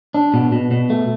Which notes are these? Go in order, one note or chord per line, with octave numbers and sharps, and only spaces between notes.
D4
B2
B2
B2
A3